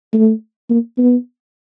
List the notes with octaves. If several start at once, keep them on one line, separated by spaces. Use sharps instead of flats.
A3
A#3
B3